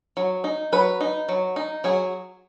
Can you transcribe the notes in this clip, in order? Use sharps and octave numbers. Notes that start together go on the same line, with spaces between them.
F#3
D#4
F#3 B4
D#4
F#3
D#4
F#3 G#4